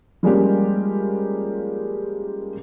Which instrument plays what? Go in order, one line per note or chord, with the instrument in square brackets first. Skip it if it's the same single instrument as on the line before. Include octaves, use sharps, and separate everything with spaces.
[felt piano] F3 G3 G#3 A#3 C#4 G4